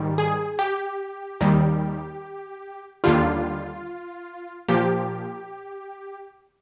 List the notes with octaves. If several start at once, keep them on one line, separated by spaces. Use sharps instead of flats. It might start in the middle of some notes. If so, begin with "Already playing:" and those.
Already playing: G#2 D#3 G3
G#4
G4
D#2 D#3 G3
D#2 D3 G3 F4
A#2 F3 G4